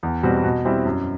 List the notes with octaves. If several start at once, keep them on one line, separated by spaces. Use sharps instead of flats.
E2
B2 G3 C4 F#4
B2
G3 C4 E4
F#2